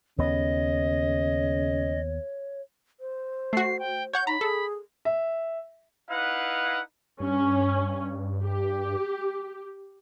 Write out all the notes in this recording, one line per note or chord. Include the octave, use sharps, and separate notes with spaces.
D#2 C#3 B3 C#5 D#5
C5
A3 F#4 C7
G5
C#5 F#5 C#6 G6
D#4 A#5 B5
G#4 A4
E5
D#4 E4 B4 F5 F#5
G2 C#4
G4